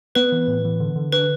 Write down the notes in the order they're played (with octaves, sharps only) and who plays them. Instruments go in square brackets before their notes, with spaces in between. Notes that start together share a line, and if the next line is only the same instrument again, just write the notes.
[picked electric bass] B3 [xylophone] B4
[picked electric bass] E3
A2
E3
D3
D3
[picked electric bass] D4 [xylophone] B4